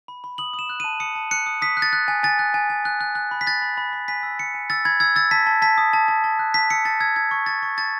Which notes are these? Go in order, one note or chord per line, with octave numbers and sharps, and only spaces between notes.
B5
B5
D#6 F#7
D#6
E7
F#6
A5 D#7
D#6 C#7
A5
F#6 C#7
D#6
D#6 B6
F#6
A6
F#6
G#5
G#5 A6
F#6
G#5
G#5
F#6
F#6
F#6
B5
B6
F#6 A6
B5
B5
B5
G#5 B6
E6
G#5 C#7
G#5
E6 A6
B5 G#6
E6 G#6
E6 A6
A5 B6
A5
A5 B6
D#6
A5
A5
A5
F#6
A5 B6
E6 C#7
A5 A6
E6 G#6
E6 G#6
C#6
A5 A6
C#6
A5 A6